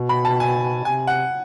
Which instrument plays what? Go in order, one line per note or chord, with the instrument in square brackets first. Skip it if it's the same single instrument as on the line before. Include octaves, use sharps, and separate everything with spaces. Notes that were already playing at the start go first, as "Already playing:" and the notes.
Already playing: [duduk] B2
[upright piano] B5
A5
G#5
[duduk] C3 [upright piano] G#5
[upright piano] F#5